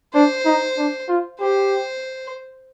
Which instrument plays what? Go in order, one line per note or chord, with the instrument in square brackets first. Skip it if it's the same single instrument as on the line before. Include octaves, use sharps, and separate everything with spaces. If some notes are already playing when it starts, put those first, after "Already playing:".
[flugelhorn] D4 [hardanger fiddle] C5
[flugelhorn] D#4
D4
F4
[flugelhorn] G4 [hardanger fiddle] C5